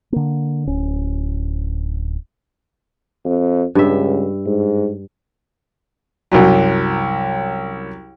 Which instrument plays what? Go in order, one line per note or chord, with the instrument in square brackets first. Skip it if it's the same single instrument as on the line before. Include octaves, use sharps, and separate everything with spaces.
[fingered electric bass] D3 A#3
D1 C#4
[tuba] F2
[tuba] C#2 [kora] G2 E5
[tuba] G#2
[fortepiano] C2 F#2 F#3